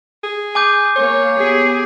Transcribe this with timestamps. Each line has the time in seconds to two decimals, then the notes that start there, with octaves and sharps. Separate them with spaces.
0.24 G#4
0.55 G#5 D6 G6
0.96 A#3 C#5
1.35 B3 G4 G#4